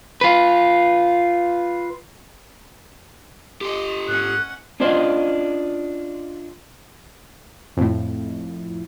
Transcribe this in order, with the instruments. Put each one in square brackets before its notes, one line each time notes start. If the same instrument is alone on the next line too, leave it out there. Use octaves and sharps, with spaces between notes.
[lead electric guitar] F4 B4
[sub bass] D1 [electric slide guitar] G4 A4 [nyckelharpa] D#5 C6
[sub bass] G#2 [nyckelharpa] C#4 F#5 [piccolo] F#6
[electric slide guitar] C#4 D4 F4 C5 D#5
[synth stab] F2 A2